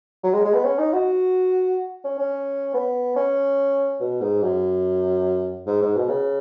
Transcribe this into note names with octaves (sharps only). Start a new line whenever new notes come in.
F#3
G#3
G#3
B3
C#4
D#4
F#4
C#4
C#4
B3
C#4
B2
G#2
F#2
G#2
G#2
B2
C#3